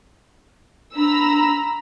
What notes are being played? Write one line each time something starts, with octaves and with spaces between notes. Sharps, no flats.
D4 A#5 B5 E6